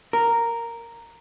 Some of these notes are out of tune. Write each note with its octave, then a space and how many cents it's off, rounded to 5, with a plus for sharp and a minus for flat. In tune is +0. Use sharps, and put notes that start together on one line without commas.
A#4 -5